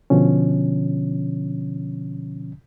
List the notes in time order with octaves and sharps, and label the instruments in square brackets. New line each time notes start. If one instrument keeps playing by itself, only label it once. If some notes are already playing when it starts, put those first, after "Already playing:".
[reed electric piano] B2 D3 F3 C#4